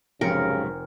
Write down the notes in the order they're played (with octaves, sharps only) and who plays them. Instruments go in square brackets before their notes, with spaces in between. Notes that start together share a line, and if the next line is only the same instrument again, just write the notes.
[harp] F1 C4 C#7 [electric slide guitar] G#2 F#3 G4 [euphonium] C#3 [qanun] A#4